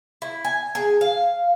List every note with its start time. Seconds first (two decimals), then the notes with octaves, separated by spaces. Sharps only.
0.22 E4
0.45 G#5
0.75 G#4
1.01 F5